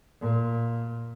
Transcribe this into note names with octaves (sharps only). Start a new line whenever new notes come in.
A#2